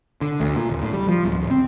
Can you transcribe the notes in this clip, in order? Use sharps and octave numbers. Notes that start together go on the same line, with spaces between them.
D3
D2
A#2
D#1
A2
G3
F3
D1
D1
C4